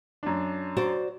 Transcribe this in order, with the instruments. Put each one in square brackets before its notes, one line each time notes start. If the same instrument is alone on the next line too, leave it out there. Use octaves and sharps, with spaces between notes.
[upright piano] F#2 D4
[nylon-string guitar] F#4 C5 D5